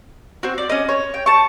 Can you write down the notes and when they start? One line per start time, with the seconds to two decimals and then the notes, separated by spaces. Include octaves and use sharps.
0.43 C4 F#4
0.58 D5
0.70 C#4 D#5
0.89 C#5
1.14 G5
1.26 A5 C#6